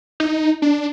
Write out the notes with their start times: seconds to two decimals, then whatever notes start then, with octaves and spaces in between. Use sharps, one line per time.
0.20 D#4
0.62 D4